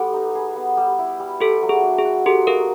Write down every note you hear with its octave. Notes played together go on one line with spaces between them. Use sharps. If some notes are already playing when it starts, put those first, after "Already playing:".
Already playing: G3 B3 G4 A4
D#4
G#4
B3
G3
E4
G3
A3 G4 A4
F#3
G#4
D4
G#4
F#4
D#4 G4 A4
A#3 G#4 A#4